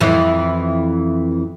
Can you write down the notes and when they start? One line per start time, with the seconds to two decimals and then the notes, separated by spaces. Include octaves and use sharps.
0.01 F2 E3